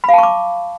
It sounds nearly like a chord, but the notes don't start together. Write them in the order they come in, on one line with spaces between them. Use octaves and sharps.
B5 F5 A5 C#6 D6